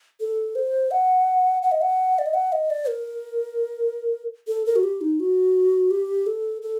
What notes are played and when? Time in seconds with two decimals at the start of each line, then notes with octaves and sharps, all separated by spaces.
0.20 A4
0.55 C5
0.91 F#5
1.62 F#5
1.72 D#5
1.82 F#5
2.19 D5
2.26 D#5
2.34 F#5
2.52 D#5
2.70 D5
2.88 A#4
4.47 A4
4.66 A#4
4.76 F#4
4.83 G4
5.01 D#4
5.20 F#4
5.91 G4
6.26 A4
6.62 A4